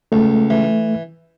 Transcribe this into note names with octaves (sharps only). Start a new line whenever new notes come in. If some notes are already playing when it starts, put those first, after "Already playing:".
C#2 A3
E3